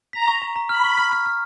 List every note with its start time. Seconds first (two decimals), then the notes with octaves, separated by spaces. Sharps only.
0.13 A#5 B6
0.28 C#6
0.42 A#5
0.56 A#5
0.69 B5 F6
0.84 C#6
0.98 F6
1.12 F6
1.26 F6